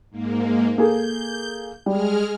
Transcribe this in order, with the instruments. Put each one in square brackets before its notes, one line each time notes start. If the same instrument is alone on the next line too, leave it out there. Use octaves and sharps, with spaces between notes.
[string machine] G#2 A#3
[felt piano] A#3 G#4 A4 [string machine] G6
[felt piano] G3 [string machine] G#3 G#4 F6